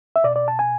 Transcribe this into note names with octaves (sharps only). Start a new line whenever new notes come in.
E5
B2 D5
D5
A5
G#5